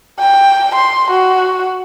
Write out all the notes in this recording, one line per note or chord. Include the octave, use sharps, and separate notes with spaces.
G5
C6
F#4